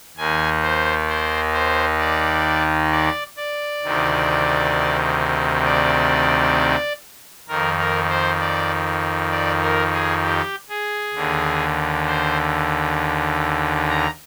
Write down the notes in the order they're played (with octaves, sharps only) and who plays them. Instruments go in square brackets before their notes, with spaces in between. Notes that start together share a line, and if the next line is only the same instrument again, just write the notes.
[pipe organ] D#2 D#3 G#5
C5
C5
C5
D5
D5
D5
D2 C3 D#3
D5
F2 D#3 A#4
A#4
C5
D5
D5
A#4
G#4
G4
G#4
D#2 D3
C5
A#5